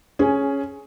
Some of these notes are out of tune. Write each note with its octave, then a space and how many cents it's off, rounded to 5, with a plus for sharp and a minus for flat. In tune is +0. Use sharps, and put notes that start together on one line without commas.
C#4 +0 G#4 +15